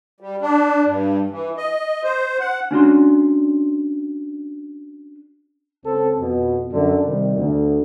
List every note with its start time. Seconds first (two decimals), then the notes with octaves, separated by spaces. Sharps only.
0.21 G3
0.42 D4
0.86 G2
1.30 E3
1.57 D#5
2.03 C5
2.39 F#5
2.71 C#4 D4 F#4 C6
5.83 C#2 C4 C#4 A4
6.19 F2 B2
6.71 F#2 D3
7.05 C3 D#3 G3
7.35 D2 D3